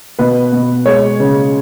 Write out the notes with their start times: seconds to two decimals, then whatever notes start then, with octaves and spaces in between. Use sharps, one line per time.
0.19 B2 B4
0.52 B2
0.86 G#3 C#5
1.20 C#3